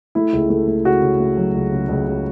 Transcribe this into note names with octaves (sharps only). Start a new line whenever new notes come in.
A3 E4
C#2
A3
A3
C#3 F#4
C#3
A3
F#3
C#2
C#3
C#2
C#3